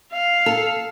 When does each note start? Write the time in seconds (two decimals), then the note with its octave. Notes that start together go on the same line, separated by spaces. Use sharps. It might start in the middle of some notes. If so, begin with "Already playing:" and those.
0.12 F5
0.46 A4